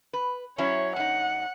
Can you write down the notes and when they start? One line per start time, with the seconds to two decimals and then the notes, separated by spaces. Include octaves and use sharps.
0.13 B4
0.58 F#3 C#4 E4 C#5
0.96 F#2 D#4 F#5